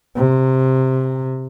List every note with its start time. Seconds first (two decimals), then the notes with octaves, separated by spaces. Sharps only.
0.16 C3